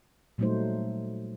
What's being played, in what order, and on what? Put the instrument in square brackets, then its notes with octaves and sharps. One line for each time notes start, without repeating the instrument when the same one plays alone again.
[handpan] A#2 F#3 G3 A3 D#4 C5